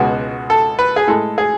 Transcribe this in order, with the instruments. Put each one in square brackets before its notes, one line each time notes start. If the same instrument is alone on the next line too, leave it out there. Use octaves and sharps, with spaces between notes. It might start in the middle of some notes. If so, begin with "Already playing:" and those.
Already playing: [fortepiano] C#2 B2 G#3 F#4
A4
B4
G#4
A2 G#3 A4
G#4